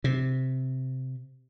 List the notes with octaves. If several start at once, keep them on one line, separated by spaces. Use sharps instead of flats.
C3